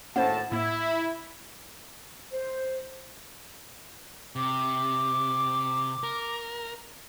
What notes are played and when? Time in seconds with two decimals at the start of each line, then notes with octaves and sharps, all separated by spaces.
0.16 G#1 A2 A#3 C#4 C5 F#5 A5
0.52 A2 A#3 E4
2.32 C5
4.36 C3 D6
6.04 A#4